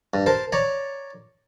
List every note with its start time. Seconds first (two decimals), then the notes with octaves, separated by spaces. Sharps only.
0.14 G2
0.26 A#4 C5 A5
0.52 C#5 D5 A#5